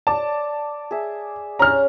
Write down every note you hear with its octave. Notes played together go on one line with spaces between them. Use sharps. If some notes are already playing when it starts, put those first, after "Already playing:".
D5 A5
G#4 E5
C#4 A#5 F6